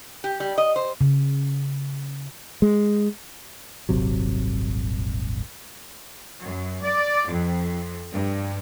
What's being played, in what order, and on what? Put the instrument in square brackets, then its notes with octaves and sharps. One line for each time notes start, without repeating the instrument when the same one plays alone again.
[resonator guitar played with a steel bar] G4
G3
D#5
C5
[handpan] C#3
[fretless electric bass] G#3
D#1 G#1 C3 F#3
[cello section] F#2
D5
F2
G2